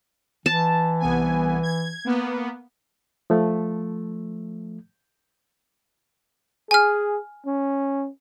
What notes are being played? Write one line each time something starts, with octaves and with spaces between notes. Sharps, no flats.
E3 A5
C2 B3 G#5
G#6
A#3 B3
F3 A3
G#4 G#5 F6
C#4